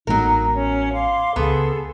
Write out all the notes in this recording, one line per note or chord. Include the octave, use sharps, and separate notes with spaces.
A1 F#3 G#3 B3 D#4 A#4
C#4
F5 C6 D6
C#2 C#3 B3 G#4 A4 C6